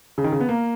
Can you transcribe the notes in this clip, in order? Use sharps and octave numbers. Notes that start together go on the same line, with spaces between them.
C#3
D#3
C#3
B3
A#3